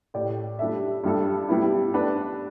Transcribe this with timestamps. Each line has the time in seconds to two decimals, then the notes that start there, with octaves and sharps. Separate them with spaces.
0.14 A2 A3 G4 D5
0.59 G3 D4 A4 E5
1.04 G2 G3 D4 A4
1.49 G3 B3 E4
1.93 A3 D4 B4 D5